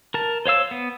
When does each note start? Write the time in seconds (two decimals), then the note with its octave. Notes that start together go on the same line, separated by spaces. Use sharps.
0.14 A#4 A5
0.46 C5 C#5 F5 E6
0.71 B3